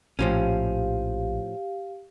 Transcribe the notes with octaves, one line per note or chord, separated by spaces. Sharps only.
A#1 A2 F3 C#4 G4 F5